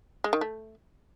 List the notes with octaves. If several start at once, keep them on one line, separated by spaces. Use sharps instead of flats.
G#3
D#3
A3